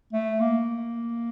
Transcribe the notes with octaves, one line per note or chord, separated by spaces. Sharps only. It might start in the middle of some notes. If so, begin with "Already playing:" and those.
A3
A#3